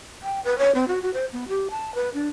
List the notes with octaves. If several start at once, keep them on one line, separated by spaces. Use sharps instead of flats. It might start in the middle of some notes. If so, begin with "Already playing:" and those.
G5
B4
C#5
C4
F#4
F#4
C5
B3
G4
A5
B4
D4